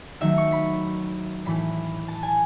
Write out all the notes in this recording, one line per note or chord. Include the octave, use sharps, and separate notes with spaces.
D#3 F#3 A3 E5
C#6
B5
A2 E3 A3 B5
A5
G#5